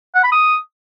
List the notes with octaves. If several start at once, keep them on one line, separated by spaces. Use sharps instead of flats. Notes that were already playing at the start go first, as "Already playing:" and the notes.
F#5
B5
D#6